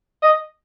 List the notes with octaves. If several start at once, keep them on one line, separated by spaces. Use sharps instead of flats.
D#5